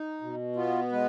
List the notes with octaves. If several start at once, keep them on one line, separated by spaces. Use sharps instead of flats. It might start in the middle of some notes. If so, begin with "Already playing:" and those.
Already playing: D#4
B2
B3 F4
G#3 B4